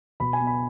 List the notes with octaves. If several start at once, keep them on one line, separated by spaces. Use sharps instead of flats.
B2 B5
G#5
B3
B5